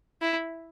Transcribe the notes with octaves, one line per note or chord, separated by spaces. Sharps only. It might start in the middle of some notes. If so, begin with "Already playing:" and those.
E4